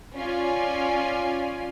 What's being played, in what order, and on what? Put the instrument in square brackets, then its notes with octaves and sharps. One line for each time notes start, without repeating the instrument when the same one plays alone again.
[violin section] C#4 F4 D5 G#5